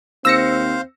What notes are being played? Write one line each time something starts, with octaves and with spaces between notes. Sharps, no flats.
D#2 C4 C5 F5 E6 A#6 C#7